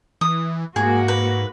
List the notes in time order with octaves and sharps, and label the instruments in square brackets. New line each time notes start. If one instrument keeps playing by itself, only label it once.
[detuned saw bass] E3 [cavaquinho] D#6
[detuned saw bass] G#2 [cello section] A#3 F#4 [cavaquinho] G#4
[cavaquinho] B4